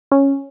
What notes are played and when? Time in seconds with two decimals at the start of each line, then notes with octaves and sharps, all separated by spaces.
0.12 C#4